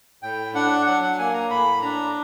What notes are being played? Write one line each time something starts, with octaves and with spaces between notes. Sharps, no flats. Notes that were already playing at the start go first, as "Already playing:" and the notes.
A2 G5
D4 F#5
F#3 F#5
F#5
A#3 G#5
A#5
A2 B5
D4 A#5